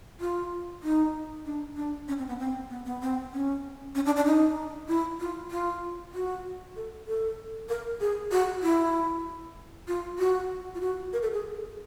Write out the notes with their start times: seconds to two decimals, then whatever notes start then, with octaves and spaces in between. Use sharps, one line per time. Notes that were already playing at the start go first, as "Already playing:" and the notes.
0.21 F4
0.83 D#4
1.46 D4
1.76 D4
2.08 C#4
2.18 C4
2.28 B3
2.39 C4
2.70 B3
2.86 B3
3.02 C4
3.33 C#4
3.95 C#4
4.06 D4
4.16 D4
4.26 D#4
4.88 E4
5.20 F4
5.51 F4
6.14 F#4
6.76 A4
7.07 A4
7.69 A#4
8.00 G#4
8.31 F#4
8.63 E4
9.88 F4
10.19 F#4
10.75 F4
10.81 F#4
11.13 A#4
11.22 A4
11.33 G#4